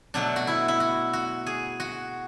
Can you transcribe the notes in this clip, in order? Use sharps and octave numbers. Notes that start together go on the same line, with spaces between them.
B2 F#3 A3 D4
F#4
E4
E4
F#4
F#4
G#4
F#4